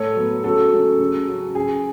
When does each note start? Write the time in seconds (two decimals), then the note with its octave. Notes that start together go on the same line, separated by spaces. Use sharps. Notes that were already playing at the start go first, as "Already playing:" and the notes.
Already playing: A2 A4 C#5
0.17 F#3 B3
0.44 C#3 F#4 A4
0.72 F#3 A3 C#4
0.99 C#3
1.27 F#3 C#4
1.55 C#3 G#4